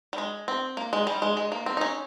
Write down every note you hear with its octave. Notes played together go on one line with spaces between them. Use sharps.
G3
G#3
C4
A#3
G#3
G3
G#3
G#3
A#3
C4
D#4
C#4